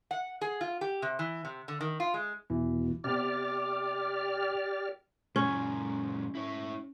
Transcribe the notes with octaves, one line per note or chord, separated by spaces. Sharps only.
F#5
G#4
F4
G4
C3
E3
C3
D3
D#3
F4
G#3
E2 B2 E3
C3 B3 G4 D5 D6 F6
F#2 A#2 C#4
E4 C#5